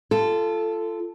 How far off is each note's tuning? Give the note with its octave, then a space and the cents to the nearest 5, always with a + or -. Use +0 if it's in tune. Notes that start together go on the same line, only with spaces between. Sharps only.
F4 -25 A4 +0